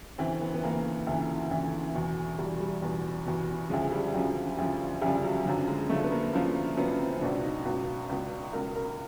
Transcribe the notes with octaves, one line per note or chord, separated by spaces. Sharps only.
D2 C#3 E3 C4
B3
B3
D2 C#3 E3 A#3
D2 C#3 E3
D2 C#3 E3
E2 B2
E2 B2 G3
G3
E2 B2
E2 B2
D2 C#3 F3 G#3
G3
D2 C#3 F3 F#3
D2 C#3 F3
D2 C#3 F3 G3
F#3
F#2 D3 F3
G#3
F#2 D3 F3 A3
B3
A#3
F#2 D3 F3 A#3
F#2 D3 F3 B3
C4
C#2 B2 D4
D#4
C#2 B2
C#2 B2
C#2 B2 A#4
A#4